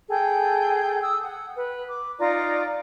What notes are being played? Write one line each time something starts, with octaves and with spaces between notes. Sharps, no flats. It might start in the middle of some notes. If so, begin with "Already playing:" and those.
G#4 A4 G5
D#6 E6
F#5
B4
D6
D#4 F4 D5 A#5